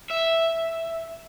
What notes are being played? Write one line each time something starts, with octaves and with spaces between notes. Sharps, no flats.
E5